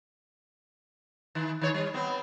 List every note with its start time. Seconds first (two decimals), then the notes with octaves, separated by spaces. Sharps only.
1.35 D#3
1.61 D#3 C#5
1.74 G3
1.94 B3 C4